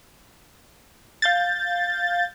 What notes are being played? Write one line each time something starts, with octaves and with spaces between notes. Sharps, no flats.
F5 G6 A6